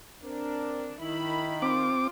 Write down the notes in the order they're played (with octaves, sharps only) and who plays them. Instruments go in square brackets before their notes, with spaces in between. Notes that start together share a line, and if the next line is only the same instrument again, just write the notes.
[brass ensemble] C4 A#4 [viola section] D4
[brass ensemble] D#3 [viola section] E4 B5
[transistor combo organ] C4 D6 [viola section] F4